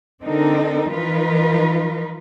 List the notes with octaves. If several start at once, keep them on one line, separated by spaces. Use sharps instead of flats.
D3 C4 D4 D#4 A4 A#4
E3 F3 D#4 F4 A#4 B4